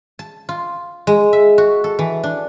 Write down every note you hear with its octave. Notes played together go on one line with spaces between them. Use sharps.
A5
F4
G#3
E5
F#4
A4
E3
D4